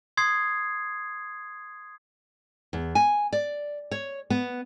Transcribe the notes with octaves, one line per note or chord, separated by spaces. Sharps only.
C6 D#6 G#6 C7
E2
G#5
D5
C#5
B3